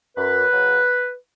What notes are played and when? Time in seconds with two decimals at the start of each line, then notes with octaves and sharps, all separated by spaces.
0.17 F#2 B4
0.52 C#3 F#3